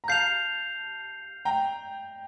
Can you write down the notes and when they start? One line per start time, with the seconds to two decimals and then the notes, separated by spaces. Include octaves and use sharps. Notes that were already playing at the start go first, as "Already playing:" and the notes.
0.04 A#5
0.08 F5 A5 G6 C7 F7
1.45 G5 A#5